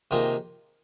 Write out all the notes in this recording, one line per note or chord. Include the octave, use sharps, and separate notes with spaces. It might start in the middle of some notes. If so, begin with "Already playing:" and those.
C3 D#3 A#3 F4 G#4